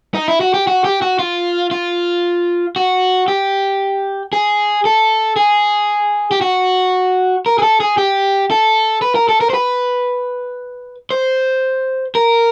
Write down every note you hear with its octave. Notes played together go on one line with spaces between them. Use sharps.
D#4
E4
F#4
G4
F#4
G4
F#4
F4
F4
F#4
G4
G#4
A4
G#4
G4
F#4
A#4
G#4
A4
G#4
G4
A4
B4
A#4
A4
A#4
C5
B4
C5
A#4